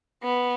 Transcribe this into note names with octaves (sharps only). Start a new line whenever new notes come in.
B3